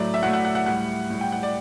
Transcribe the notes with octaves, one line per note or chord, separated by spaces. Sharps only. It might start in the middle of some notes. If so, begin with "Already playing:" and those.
Already playing: A2 F#3 A3 D5
E5
A2 F#3 A3 F#5
F#5
F#5
F#5
A2 G3 F#5
A2 G3
G5
F#5
D5